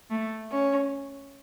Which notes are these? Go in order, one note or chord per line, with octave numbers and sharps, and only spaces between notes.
A3
C#4